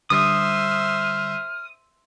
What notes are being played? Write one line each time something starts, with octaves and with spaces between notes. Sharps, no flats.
D3 G3 C5 E5 D#6 F6